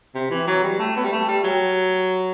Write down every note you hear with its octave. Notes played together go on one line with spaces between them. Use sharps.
C3
E3
F#3
G3
A3
B3
G3
A3
G3
F#3